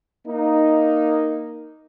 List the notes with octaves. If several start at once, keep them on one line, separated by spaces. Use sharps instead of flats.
A#3 D#4